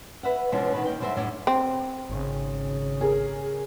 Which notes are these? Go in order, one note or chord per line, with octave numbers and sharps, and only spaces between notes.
B4 E5 F#5
B2 D3 E3 F3 G#3 C#4
B2 D#3 B4
A#3 D#4 G5
F#2 D3 G3 C5 D#5 E5
F#2 A2 G3 D4 A4
C4
G#1 C#3
G#4 A#4